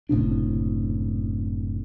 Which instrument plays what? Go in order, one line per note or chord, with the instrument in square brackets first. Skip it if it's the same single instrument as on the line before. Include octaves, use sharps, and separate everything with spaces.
[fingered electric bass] F#1 A2 C3 D4